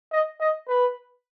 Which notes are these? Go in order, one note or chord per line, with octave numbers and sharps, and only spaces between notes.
D#5
D#5
B4